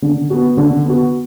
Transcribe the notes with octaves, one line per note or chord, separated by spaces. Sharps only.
D3
B3 F#4
D3
B3 F#4